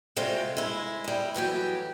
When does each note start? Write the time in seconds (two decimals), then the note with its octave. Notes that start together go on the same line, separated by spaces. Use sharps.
0.16 C3 G3 G#3 C4 F4 F#4
0.57 G#3 E4
1.04 G3 G#3
1.34 A2 E3 F#3 G4